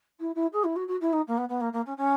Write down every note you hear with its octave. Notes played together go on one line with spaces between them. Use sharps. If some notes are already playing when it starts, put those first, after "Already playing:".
E4
E4
G#4
E4
F#4
F#4
E4
D#4
A#3
B3
B3
A#3
A#3
C#4
C#4